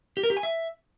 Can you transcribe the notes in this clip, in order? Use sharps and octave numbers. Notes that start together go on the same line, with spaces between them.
G4
A#4
G4
G#5
E5